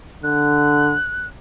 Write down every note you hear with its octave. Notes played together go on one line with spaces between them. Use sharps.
D3 F#6